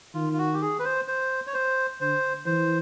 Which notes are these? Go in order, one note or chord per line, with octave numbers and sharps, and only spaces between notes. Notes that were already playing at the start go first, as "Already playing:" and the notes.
D#3 F4
F4
F#4
G4
G#4
B4
C5
C5
C#5
C5
D3 C5
E3 C5